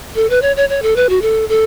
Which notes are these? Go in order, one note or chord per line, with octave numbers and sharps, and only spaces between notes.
A4
B4
C#5
C#5
C#5
A4
B4
F#4
A4
A4